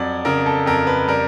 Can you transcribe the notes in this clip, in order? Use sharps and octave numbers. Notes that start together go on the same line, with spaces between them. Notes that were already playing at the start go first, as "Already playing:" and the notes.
Already playing: F2 F#3 D5
C#3 A#4
A4
F2 A#4
B4
G3 A#4